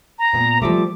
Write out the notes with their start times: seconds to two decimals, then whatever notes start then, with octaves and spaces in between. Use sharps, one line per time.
0.19 A#5
0.33 A#2 B3
0.62 F3 G3 A3 D6